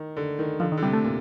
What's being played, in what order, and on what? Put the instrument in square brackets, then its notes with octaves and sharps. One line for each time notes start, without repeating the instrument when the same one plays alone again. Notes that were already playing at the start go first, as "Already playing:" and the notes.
Already playing: [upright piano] D#3
D3
D#3
[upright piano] D3 [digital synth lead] F3
[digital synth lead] D#3
[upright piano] D3
[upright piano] C3 [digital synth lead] G3
[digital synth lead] A3
[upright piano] A#2